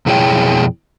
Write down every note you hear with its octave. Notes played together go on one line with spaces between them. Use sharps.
F2 B2 E4 G#4 C#5 G5